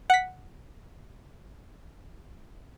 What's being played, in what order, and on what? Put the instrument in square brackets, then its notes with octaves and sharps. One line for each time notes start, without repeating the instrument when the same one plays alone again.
[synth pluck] F#5 B6